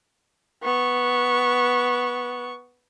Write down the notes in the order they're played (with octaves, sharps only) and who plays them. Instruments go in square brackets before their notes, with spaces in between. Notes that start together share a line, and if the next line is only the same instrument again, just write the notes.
[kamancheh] B3 C#6